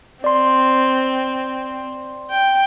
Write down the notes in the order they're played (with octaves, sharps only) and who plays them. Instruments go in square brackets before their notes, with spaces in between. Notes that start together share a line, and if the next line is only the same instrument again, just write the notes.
[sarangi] C4 [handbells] D5 C6
[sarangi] G5